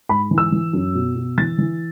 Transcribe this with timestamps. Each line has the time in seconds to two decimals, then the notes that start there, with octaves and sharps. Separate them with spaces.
0.09 G#2 B5
0.31 E3
0.38 E6
0.52 E3
0.73 F#2
0.95 B2
1.15 B2
1.37 E3 A6
1.58 E3